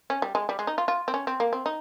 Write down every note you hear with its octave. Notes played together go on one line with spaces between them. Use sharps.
C#4
G3
G#3
G3
G#3
D#4
F4
F4
C4
C#4
C4
A#3
C4
D#4